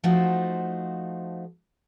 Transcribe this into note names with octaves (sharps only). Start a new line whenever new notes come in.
F3 A3 D#4 F#4 C5